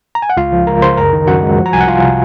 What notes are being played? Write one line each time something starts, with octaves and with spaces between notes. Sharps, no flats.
A#5
G#5
F#5
C#2 F4 F5
F3
C#2 A#4 A#5
C#3 C5 C6
F#2 A#4 A#5
D#3
F#2 F#4 F#5
G#3
F3
A#5
C2 G#5
F#5
C2 F4 F5
C3